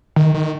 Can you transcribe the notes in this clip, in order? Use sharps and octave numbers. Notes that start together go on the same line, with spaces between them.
D#3
D#3